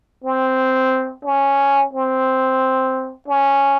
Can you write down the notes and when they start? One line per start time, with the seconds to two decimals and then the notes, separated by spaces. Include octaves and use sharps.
0.24 C4
1.25 C#4
1.93 C4
3.28 C#4